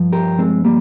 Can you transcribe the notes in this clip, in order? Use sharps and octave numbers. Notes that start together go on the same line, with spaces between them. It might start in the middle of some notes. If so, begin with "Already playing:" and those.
Already playing: G2 F3
G4 A#4
G#3 C4
G3 A#3